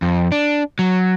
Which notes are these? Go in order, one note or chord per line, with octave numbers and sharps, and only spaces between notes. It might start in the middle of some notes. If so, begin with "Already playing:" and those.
F2
D4
F#3